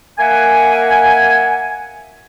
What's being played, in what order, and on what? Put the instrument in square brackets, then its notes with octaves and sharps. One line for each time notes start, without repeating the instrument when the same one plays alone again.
[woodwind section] A#3 E5 F#5 G#5